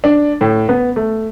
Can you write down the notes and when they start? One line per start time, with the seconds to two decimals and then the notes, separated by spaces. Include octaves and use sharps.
0.04 D4
0.41 A2
0.69 B3
0.96 A3